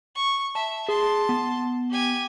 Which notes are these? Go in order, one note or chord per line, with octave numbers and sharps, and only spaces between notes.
C#6
E5 A5
G#4 A5 C6
B3
G4 G#5